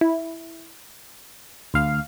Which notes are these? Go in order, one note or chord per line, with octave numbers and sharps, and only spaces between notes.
E4
D2 F5